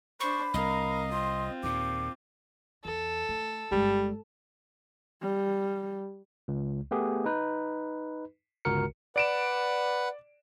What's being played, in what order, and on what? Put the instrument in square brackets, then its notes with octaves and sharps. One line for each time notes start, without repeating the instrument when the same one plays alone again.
[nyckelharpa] D4 C5 [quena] B5 [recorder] C#6
[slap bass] C2 [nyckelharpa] A#4 F5 [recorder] D#5
[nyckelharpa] C4 F4 [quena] C6
[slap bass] D#2 A#2 [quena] D6
[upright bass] E2 [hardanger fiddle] A4
[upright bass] A3
[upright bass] G1 G#3 [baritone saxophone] G3
[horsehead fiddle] G3
[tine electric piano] C#2
A3 B3 G4 G#4
D#4 B4
G1 C#2 F#4 A#4 C#7
[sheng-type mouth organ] B4 F#5 [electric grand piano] D5 D7 E7